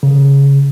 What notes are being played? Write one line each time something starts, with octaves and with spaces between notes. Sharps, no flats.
C#3